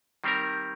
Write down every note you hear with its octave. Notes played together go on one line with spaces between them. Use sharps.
D#3 G3 C4 G4 A#4